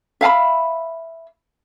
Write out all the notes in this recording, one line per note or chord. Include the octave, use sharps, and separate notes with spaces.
E5 F5 G#5 B5